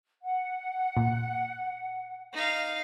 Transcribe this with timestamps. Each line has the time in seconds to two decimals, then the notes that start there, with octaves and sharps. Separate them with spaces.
0.22 F#5
0.97 A#2
2.33 D#4 F5